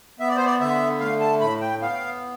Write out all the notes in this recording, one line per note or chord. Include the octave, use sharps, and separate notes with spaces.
B3 E5
D5
C5
D5
D3 E5
A3 F5
A5
A2 B5
G5
B3 F5